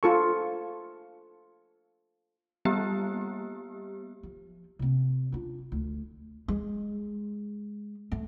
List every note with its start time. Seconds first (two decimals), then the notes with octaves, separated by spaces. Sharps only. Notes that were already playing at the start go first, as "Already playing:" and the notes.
0.03 F4 A4 C#6
2.65 G3 A#3 B3 G4
4.23 F3
4.79 C3 C4
5.32 D4 F4
5.72 D2
6.48 G#3
8.12 A3